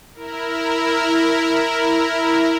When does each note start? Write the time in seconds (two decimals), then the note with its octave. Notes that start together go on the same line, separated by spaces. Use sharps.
0.14 E4 A#4